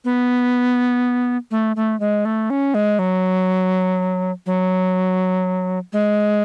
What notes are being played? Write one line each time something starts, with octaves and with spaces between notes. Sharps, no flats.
B3
A3
A3
G#3
A3
C#4
G#3
F#3
F#3
G#3